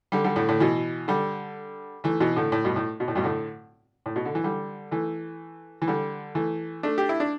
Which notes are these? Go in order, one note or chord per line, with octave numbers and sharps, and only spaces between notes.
D3 G3
D3 G3
A2 D3
A2 D3
B2 E3
D3 G3
E3 A3
B2 E3
A2 D3
A2
G2 B2
A2
B2
A2
G2 B2
A2 D3
A2
B2
D3
E3
D3 G3
E3 A3
E3
D3 G3
E3 A3
A3 D4
G4
E4
D4